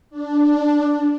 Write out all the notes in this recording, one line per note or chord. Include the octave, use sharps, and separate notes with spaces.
D4